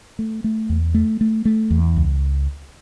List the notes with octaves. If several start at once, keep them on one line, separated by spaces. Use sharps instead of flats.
A3
A3
E2
A3
A3
A3
E2
C#2